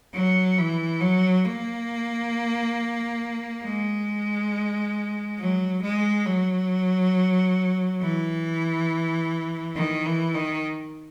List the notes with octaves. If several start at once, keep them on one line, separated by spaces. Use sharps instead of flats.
F#3
E3
F#3
A#3
G#3
F#3
G#3
F#3
E3
D#3
E3
D#3